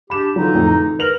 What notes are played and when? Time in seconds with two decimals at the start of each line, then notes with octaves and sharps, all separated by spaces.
0.10 D4 G4 B5 E7
0.36 D3 E3 F#3 D#4 F4
0.55 F2 A2
0.67 A#5
0.99 A#4 B4 F7 F#7